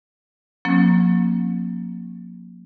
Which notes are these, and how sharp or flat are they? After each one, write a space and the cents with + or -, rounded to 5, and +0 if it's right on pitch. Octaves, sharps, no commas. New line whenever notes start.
F3 +45 A#3 +0 C#4 -40